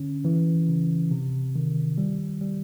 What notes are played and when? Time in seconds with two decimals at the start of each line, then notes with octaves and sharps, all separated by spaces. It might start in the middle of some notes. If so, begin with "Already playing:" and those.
Already playing: D3 C#4
0.25 E3
0.69 C#3
1.11 C3
1.56 D#3
1.98 G3
2.41 G3